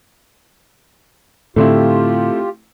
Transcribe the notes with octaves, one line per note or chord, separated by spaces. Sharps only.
A2 D3 A3 C4 E4 F4 G4